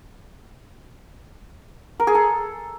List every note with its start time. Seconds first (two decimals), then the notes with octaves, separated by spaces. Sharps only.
2.00 A#4
2.07 G#4
2.15 A4